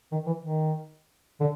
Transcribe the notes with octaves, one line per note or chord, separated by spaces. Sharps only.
D#3
E3
D#3
D3